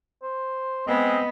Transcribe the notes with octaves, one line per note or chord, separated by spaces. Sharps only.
C5
G#3 B3 C4 D#5